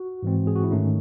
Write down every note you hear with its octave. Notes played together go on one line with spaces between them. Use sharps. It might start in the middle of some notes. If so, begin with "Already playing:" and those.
Already playing: F#4
G#2 E3 G#3 C4
G#4
F#4
E4
G#2 D#3 A3 C#4 D#4